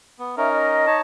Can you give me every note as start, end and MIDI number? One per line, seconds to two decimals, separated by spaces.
0.19 0.35 59
0.37 0.86 61
0.37 0.86 63
0.37 0.86 70
0.37 0.50 76
0.53 0.97 75
0.86 1.01 63
0.86 1.01 73
0.86 1.01 81